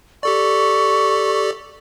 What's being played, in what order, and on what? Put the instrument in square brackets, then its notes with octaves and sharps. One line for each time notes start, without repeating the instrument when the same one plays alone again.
[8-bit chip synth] G4 A4 D5 [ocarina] C#6